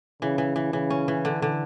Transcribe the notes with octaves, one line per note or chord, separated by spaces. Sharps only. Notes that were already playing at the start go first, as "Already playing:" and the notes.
C#3 E3
E3
E3
C#3 E3
C#4
E3
D3
D3